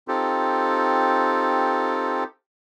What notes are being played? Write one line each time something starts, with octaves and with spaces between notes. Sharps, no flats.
C4 D#4 F4 G4 A4